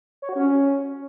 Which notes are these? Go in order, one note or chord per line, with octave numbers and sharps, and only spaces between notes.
C#5
F#4
C#4